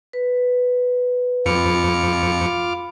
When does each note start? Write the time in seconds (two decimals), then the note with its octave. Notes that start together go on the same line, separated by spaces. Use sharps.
0.13 B4
1.46 F2 F4 B5 D6 F6 C#7